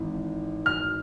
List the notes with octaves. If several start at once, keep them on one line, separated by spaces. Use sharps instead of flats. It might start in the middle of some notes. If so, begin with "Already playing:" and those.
Already playing: G#1 G#2 E3
F6